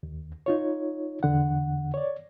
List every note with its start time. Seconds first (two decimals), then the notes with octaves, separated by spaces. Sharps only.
0.03 D#2
0.46 D#4 F4 C#5
1.23 E2 D3 F#5
1.94 C#5 D5